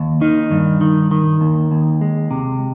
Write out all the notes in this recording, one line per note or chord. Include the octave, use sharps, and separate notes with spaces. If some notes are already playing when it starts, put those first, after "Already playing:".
Already playing: D#2
D#3 D#4
G2
D#3
D#3
D#2
D#2
G#3
C3